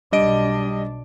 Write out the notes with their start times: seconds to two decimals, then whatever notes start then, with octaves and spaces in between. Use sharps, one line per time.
0.12 B1 G3 D4 D#5 D7